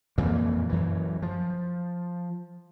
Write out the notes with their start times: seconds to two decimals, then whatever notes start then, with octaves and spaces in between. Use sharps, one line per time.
0.18 F2 A#2 E3 A#3
0.69 F#2 E3
1.22 F3